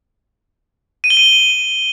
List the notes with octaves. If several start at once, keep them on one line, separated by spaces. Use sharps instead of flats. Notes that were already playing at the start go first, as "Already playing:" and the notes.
D#7
G7
D#7
G7